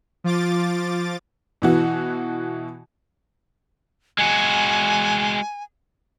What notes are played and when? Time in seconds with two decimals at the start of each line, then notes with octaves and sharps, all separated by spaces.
0.24 F3 F4 D6 A6
1.62 B2 E3 F#4
4.18 G#3 F#4 G#5